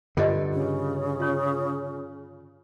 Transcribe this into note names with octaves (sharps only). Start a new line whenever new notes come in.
G2 D3 F4 G4 D#5
C#3
F4 C#5